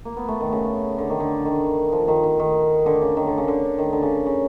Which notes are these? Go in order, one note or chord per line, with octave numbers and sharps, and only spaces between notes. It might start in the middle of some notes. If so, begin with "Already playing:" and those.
A#3
B3
A3
D#3
C#3
D3
D#3
D3
D#3
F3
D#3
D#3
D#3
D3
C#3
D#3
D3
C#3
D3
D#3
D3
C#3
C#3